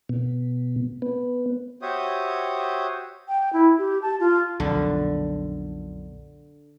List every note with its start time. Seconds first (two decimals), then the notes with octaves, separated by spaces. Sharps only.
0.09 B2
1.02 B3
1.82 F#4 G4 C5 C#5 E5 D#6
3.28 G5
3.53 E4
3.79 G4
4.02 A5
4.20 F4
4.60 B1 F2 A#2 D3